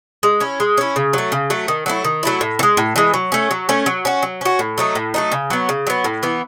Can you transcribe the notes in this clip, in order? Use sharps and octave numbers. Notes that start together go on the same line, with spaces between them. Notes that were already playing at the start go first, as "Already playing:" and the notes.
G#3
C#4 E4
G#3
C#4 E4
C#3
F#3 A3
C#3
F#3 A3
D#3
F#3 A3 E4
D#3
F#3 A3 E4
A2
E3
G#3
A2
E3 G#3
F#3
A3 C#4
F#3
A3 C#4
F#3
C#4 F#4
F#3
C#4 F#4
A2
F#3 A3 D#4
A2
F#3 A3 D#4
C#3
F#3 B3
C#3
F#3 B3
A2
E3 B3